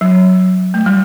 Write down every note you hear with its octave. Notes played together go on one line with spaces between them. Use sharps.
F#3
A3
G3